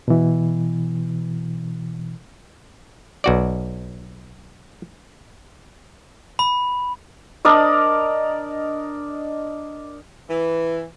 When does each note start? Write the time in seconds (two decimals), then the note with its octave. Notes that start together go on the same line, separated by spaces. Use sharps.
0.08 B2 E3
3.24 B1 F#4 D5
6.39 B5
7.45 D4 A#4 D5 D#5
10.28 E3